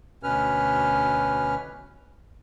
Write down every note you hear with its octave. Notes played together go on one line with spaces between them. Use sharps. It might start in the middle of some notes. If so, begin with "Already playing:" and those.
D2 B2 C#4 B4 F6